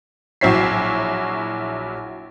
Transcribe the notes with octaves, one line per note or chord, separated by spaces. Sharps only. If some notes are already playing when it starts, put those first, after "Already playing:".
A#1 F#3 E4 C#5 B6 C7